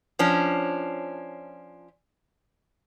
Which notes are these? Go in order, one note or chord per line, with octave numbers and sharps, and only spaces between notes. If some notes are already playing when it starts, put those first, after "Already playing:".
F3 C#4 D4